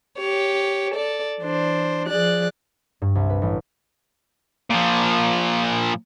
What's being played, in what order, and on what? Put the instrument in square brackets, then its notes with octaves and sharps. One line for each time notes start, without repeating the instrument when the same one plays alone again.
[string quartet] G4 C#5
A4 D5
E3 D4 C5
F3 G#4 D5 F#6
[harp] G2
C2
B4
A1
[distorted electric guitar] A#2 F3